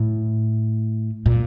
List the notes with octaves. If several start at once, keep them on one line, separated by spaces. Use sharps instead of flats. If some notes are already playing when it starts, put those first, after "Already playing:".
Already playing: A2
A#2